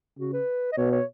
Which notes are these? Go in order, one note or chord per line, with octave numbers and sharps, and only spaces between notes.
C#3 F#4
B4
D#5
B2 C#5
C#5